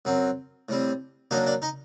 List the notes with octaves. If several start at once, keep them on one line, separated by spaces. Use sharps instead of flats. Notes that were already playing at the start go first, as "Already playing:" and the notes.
F#2 F#3 C4
A2 G3 C4
F#2 F#3 A#3 D4 D#4 D#5
D4 D5
D#4 D#5